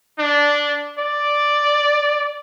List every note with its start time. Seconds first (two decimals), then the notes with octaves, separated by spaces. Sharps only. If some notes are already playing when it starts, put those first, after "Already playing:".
0.19 D4
0.99 D5